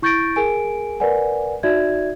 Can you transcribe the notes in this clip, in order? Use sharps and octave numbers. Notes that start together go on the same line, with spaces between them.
E4 C#6 G6 A6 A#6 D7
G#4 A#4 G#5 D7
A#4 B4 D5 F#5 G#5
D#4 F#4 D5 E5 G#6